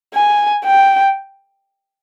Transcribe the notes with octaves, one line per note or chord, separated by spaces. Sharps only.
G#5
G5